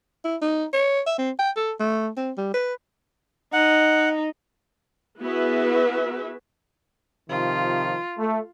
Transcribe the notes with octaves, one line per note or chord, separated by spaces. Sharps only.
E4
D#4
C#5
E5
C4
G5
A4
A3
C4
G3
B4
D#4 F#5
B3 E4 F#4 G#4 B4 E5
C3 D#3 F3 F4
A3